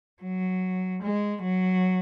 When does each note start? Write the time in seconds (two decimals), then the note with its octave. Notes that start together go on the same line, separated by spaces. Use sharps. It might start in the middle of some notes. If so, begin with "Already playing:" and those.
0.23 F#3
1.03 G#3
1.43 F#3